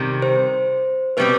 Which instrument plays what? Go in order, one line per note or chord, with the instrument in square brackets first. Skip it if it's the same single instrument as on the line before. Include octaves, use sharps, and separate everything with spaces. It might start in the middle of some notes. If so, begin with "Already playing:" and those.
Already playing: [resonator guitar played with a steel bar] C3 D#3 G3
[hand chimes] C5
[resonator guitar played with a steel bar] B2 G3 C4 [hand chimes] B4